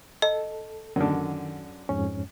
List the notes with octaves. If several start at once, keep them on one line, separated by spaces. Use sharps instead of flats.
A4 D#5
F#2 D3 D#3
F2 G#2 C#4